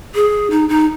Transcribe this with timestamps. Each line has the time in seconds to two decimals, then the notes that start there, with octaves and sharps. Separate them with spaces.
0.15 G#4
0.51 D#4
0.69 D#4